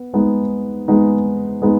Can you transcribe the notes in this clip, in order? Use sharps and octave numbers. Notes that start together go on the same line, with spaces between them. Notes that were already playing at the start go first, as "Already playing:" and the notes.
Already playing: B3
G#3 B3 D#4
G#3 B3 D#4
G#3 B3 D#4